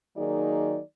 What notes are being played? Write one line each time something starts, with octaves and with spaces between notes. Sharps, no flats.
D#3 F#3 A#3 D#4 G#4 D5